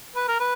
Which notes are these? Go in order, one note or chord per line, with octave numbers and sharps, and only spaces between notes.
B4
A#4
B4